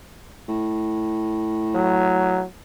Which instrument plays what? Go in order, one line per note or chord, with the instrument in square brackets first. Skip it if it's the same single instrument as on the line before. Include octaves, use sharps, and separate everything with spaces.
[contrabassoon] A2
[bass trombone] F#3